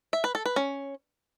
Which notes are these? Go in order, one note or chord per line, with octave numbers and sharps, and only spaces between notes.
E5
B4
A4
B4
C#4